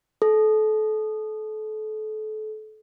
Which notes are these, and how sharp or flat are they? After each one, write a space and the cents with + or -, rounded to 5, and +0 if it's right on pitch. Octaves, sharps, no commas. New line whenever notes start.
A4 -30